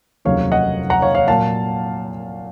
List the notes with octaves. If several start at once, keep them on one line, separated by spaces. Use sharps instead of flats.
F1 D#2 C#3 F#3 C#5 F5
D#5 F#5
F#5 A#5
C#5 F5
C#5 F5
A#2 F#3 F5 A5